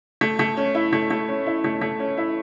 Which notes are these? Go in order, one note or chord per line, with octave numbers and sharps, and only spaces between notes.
A3
A3
C#4
E4
A3
A3
C#4
E4
A3
A3
C#4
E4